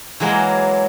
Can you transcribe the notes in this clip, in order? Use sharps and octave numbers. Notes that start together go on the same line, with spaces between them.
E3 F#3 G#3 A#3